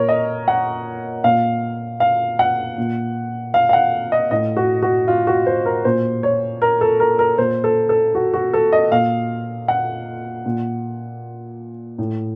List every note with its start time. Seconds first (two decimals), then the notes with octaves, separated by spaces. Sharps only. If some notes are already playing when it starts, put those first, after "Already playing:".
Already playing: A#2 A#4 C#5
0.09 D#5
0.48 F#5
1.24 A#2 F5
2.00 F5
2.39 F#5
2.78 A#2
3.54 F5
3.69 F5
3.73 F#5
4.12 D#5
4.31 A2 D#5
4.57 F#4
4.82 F#4
5.08 F4
5.27 F#4
5.46 C5
5.66 A#4
5.85 A#2 C5
6.23 C#5
6.62 A#4
6.81 A4
7.00 A#4
7.19 A#4
7.38 A#2 C5
7.64 A4
7.89 A4
8.15 F#4
8.34 F#4
8.53 A4
8.73 D#5
8.92 A#2 F5
9.68 F#5
10.46 A#2
11.98 A2